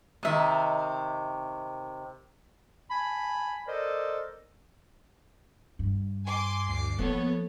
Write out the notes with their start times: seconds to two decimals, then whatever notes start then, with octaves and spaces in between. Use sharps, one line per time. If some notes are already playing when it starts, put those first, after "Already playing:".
0.23 C3 D#3 D#5 E5
2.90 G#5 A5 B5
3.67 A4 A#4 C5 D5 D#5
5.79 G2
6.25 G#5 C6 D6
6.68 D2 D6 C7
6.99 F3 A#3 B3 A4 C#5